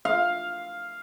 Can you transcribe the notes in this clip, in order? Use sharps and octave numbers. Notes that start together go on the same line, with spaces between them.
F5